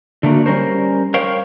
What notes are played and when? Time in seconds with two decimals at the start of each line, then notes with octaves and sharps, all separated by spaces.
0.23 D3 A3 A#3 F#4
0.46 G3 C#4 A#4 C5
1.14 A#4 C5 C#5 F5 G5